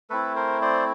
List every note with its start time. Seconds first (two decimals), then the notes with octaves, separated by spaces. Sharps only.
0.10 A3 C4 E4 A4 B4
0.36 A#4 C5
0.61 C5 D5